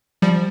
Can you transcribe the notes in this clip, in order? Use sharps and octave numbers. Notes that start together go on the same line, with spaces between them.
F3 G3